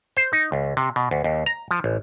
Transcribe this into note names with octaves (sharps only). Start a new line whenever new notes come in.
C5
D#4
C#2
C3
B2
D2
D#2
A#5
F3
A1